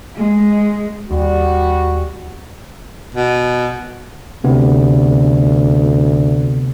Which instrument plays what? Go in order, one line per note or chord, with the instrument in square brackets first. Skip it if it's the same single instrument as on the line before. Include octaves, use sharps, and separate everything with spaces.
[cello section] G#3
[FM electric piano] D#2 [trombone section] G3 F#4
[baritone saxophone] B2
[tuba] D2 [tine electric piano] C3 B3